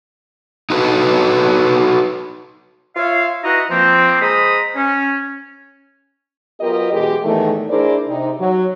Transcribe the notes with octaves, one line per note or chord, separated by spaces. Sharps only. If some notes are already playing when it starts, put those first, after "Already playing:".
D#4 F#4 A4 B4
F4 C#5 E5 F5
E4 F#4 B4 D#5 F#5 A#5
F3 A#3 C4
G#3 C5 A#5 B5 D#6
C#4
F#3 B3 F4 G4 A#4 D#5
B2 E3 G#3 G4
E2 A2 D#3 E3 A3
D4 E4 G#4 A#4 C5 D5
C3 D#4
F#3